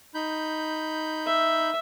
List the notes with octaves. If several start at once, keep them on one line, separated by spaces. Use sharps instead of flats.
D#4 B5 G6
E5